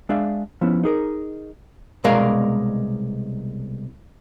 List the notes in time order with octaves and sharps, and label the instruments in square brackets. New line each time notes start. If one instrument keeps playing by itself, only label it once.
[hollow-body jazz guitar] G#3 D4 G#4 D5 E5 F5
F3 B3 C#4 E4
D#4 G#4 A#4
C2 B2 G#3 A#4 D5 F5